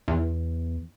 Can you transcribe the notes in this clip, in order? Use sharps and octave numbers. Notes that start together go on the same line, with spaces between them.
E2